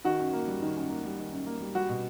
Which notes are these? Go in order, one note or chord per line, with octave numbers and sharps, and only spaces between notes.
D#3 F#4
F#2
A#3
G3
D#3
F#2
A#3
G3
D#3
F#2
A#3
G3
G3 F#4
B2